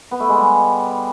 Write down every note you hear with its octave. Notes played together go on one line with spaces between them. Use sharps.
B3
A3
G#3
G3